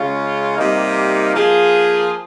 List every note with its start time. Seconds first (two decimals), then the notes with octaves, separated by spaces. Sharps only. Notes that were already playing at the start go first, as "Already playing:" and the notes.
Already playing: C#3 G#3 C#4 F4
0.56 C3 G3 A#3 D#4
1.35 F3 A#3 F4 G#4